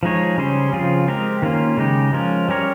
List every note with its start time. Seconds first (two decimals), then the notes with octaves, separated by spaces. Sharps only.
0.03 F3 G#3 D#4 G#4 C#5
0.38 C#3 G3 C#4 G#4 C5
0.72 C#3 F3 C4 F4 G#4
1.08 G#3 C4 G4 A#4
1.42 D#3 A#3 C#4 F4
1.78 C#3 G#3 D#4 G4
2.13 F3 G#3 C#4 F4 A#4
2.49 G3 C#4 G4 A#4 C#5